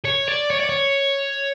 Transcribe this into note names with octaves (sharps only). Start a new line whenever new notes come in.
C#5
D5
C#5
D5
C#5